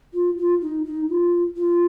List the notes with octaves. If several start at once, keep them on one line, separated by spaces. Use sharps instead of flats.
F4
F4
D#4
D#4
F4
F4